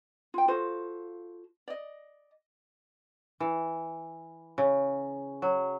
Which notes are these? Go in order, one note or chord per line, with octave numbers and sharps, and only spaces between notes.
F4 G5
F4 F#4 A4 C5
D5 D#5
E3
C#3
F#3